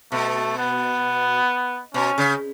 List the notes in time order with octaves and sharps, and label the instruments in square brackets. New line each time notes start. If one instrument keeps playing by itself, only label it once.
[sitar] B2 [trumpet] A3
[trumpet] B3
[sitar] B2 [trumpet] C#4
[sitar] C#3